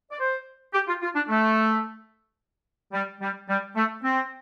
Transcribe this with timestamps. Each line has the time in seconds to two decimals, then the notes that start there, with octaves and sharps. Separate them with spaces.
0.11 D5
0.19 C5
0.74 G4
0.88 F4
1.02 F4
1.15 D4
1.29 A3
2.93 G3
3.21 G3
3.49 G3
3.76 A3
4.03 C4